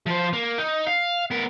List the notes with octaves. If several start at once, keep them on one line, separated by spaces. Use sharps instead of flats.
F3 C5
A#3
D#4
F5
B3 A#4